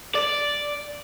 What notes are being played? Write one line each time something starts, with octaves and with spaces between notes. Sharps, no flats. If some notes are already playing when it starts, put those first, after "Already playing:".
D5